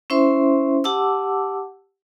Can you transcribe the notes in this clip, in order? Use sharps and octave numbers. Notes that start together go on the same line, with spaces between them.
C#4 E4 C5 E5 C6
G4 F#5 A5 D6 E6